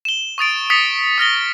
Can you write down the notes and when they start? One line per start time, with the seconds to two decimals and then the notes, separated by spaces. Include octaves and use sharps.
0.05 E7 G7
0.38 C#6 D#6 A6 D7
0.70 D#6 A6 B6 C#7
1.18 D#6 F6 A#6 G7